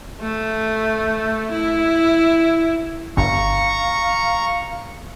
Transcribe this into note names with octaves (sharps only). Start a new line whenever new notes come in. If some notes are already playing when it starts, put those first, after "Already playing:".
A3
E4
G1 G2 F5 A#5 C#6